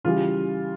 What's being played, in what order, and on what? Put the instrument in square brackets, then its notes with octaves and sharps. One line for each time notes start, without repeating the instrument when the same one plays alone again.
[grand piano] C#3 E3 G3 F4